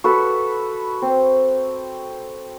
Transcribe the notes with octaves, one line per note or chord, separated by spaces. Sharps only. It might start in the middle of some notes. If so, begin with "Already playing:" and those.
F#4 A4 B4
C4